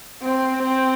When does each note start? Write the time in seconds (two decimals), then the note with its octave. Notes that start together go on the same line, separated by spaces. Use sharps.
0.23 C4
0.63 C4